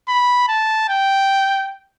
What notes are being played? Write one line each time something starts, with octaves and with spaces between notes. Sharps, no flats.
B5
A5
G5